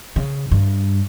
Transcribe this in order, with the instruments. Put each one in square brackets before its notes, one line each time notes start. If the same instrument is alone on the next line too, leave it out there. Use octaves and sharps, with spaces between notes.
[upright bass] C#3
G2